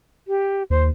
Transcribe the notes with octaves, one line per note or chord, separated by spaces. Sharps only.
G4
D#2 C5